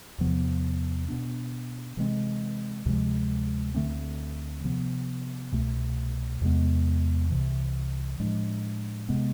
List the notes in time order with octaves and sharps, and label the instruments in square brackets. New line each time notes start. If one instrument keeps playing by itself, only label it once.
[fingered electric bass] E2 C3 F3 B3
B2 B3 D4
C3 E3 G#3 C4
D2 C3 F3 G#3
D2 D3 A3 C4
C3 F3 B3
C2 B2 A3
E2 C3 G#3 B3
C2 C3 E3
A2 F3 G#3 D4
C3 G#3 B3